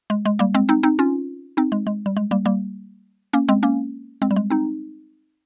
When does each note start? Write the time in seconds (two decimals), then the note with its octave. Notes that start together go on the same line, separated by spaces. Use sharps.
0.10 G#3
0.25 G#3
0.39 G3 A#3
0.54 G#3 C4
0.69 C4 D#4
0.83 C4 D#4
0.99 C#4 F4
1.57 C4 D#4
1.72 G#3
1.87 G#3
2.06 G3
2.16 G#3
2.31 G3 A#3
2.45 G3 A#3
3.33 A#3 C#4
3.48 G#3 C4
3.63 A#3 C#4
4.22 G#3 C4
4.31 G3
4.36 G#3
4.50 C4 D#4